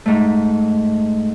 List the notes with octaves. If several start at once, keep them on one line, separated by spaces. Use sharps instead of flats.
G#2 A3